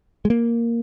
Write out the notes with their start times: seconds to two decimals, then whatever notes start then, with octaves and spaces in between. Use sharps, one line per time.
0.25 G#3
0.30 A#3